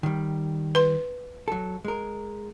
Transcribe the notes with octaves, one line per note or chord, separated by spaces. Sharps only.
D#3 G3
B4 C6
F#3 A4
G#3 A#4